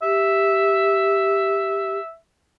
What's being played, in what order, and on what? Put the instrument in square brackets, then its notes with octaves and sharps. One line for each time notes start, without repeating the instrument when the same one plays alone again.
[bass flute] G4 [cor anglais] E5